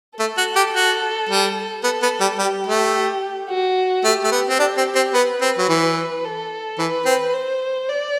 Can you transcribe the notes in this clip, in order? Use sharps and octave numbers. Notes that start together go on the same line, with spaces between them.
A3 A4
F#4
G4
F#4
G3
B3 A4
B3
G3
G3 G4
A3
F#4
A3 G4
A3
B3
C4
D4 G4
C4
C4
B3 B4
C4
F#3
E3
A4
E3 B4
C4
C5
D5